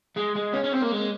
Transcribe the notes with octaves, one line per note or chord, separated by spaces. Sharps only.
G#3
G#3
C#4
C#4
C4
A#3
G#3